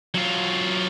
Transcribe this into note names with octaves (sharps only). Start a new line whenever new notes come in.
F#3 F4